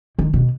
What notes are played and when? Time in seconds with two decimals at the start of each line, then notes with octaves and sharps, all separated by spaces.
0.19 D#3
0.34 B2